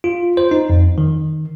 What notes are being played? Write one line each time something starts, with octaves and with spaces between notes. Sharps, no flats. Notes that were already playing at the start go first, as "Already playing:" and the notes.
F4
C5
D#4
F2
D#3